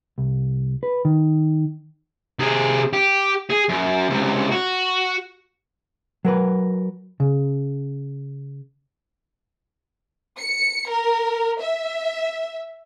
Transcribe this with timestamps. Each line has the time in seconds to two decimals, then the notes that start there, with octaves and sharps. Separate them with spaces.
0.18 C2
0.83 B4
1.05 D#3
2.39 C3 G#4
2.93 G4
3.50 G#4
3.69 F#2
4.10 C#2 C3
4.52 F#4
6.25 F#3 A#4 B4
7.20 C#3
10.39 C#7
10.89 A#4
11.62 E5